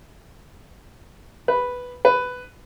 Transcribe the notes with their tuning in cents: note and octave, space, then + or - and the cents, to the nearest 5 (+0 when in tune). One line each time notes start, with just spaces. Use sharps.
B4 +0
B4 +10